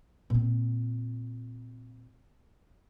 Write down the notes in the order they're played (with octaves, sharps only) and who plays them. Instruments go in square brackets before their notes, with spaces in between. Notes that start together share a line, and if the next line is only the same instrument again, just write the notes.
[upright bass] A#2 C4